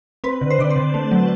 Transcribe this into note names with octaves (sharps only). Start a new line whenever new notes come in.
C4 B4
D3
C5
D3 D5
C5
D3
A3
F#3